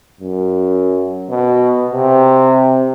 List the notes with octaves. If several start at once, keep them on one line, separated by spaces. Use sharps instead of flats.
F#2
B2
C3